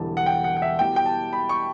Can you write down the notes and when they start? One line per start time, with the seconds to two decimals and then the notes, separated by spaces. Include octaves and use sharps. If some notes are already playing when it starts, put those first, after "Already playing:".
Already playing: E1 E2 D3 G3 A5
0.17 F#5
0.26 G5
0.44 F#5
0.57 F#5
0.62 E5
0.79 E2 B2 G3 G5
0.96 G5
1.06 A5
1.33 B5
1.49 C#6